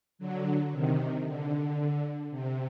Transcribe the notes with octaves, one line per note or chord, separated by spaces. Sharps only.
D3 F#3
C3 D#3
D3
C3